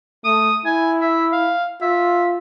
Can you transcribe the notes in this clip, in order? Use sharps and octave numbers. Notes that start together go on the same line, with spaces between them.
A3 D#6
E4 G#5
E5
F5
F4 E5